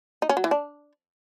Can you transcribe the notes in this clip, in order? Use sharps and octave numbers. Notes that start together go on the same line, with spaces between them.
D#4
C#4
F#3
E3
D4